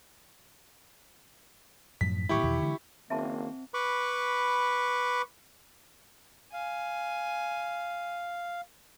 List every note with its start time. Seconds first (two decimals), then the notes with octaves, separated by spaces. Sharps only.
2.01 F#2 A2 F3 B6
2.29 A2 D#3 G3 E4 G4 C#6
2.43 E2 B2 D#3
2.62 D3 E3 G#3
3.10 F#1 D#3 A#3 C4 E5 A5 C6
3.74 B4 B5 C#6 D6
6.53 F5 G#5